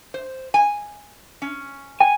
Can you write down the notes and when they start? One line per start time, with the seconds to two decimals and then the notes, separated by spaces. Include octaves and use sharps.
0.14 C5
0.54 G#5
1.42 C#4
2.00 G5 G#5